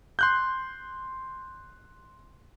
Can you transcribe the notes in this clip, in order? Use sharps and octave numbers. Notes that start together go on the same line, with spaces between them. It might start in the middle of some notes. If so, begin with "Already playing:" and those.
C6 F#6 G6